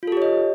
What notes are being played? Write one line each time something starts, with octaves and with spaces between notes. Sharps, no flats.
F4 G4 A4 C#5 D#5